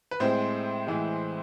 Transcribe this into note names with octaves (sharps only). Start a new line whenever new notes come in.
B4
A2 G#3 C4 C5
A2 E3 G#3